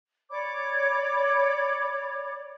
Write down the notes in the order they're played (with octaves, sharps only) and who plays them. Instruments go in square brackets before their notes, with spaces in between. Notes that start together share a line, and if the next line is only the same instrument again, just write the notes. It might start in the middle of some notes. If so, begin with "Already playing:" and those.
[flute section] C#5 D5 B5 D6